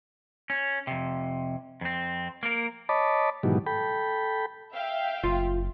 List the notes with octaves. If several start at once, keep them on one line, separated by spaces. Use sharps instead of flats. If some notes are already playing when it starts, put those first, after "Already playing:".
C#4
F2 C3
F2 C4
A#3 A#4
C#5 D#5 A5 B5 D6
G#2 B2 D#3 E3 F#3 G3
A4 G5 B5
E5 F5 G5
F#1 F4